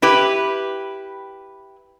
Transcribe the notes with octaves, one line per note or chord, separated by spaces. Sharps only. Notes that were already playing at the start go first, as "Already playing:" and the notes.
E4 G4 B4